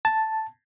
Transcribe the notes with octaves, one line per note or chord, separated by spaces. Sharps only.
A5